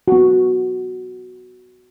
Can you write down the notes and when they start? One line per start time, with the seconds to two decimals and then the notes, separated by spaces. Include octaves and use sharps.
0.08 B3 F#4